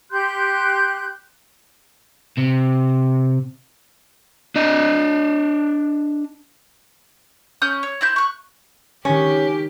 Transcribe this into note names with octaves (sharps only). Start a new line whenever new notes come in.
G4 C6 F#6 G6
C3
D4 D#5
C#4 D#6 F#6 G6
C#5
C4 E4 G6
C#6 F#6
D#3 G#3 C#4 G4